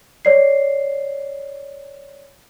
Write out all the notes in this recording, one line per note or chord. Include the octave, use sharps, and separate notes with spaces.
C#5 D5 C7